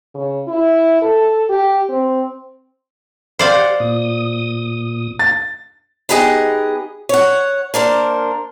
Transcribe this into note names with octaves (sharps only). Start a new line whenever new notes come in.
C#3
E4
A4
G4
C4
G4 C5 D5 F5 F#5 G6
A#2 D#6
A6
B3 D#4 G4 G#4 D#5 F#5
C#5 F#5
A#3 D4 A#4 C5